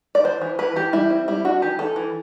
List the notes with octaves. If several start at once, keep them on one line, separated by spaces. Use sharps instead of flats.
D5
E3 C5
E3
E3 B4
E3 G4
G3 E4
C4
G3 E4
D4 F#4
E3 G4
E3 A4
E3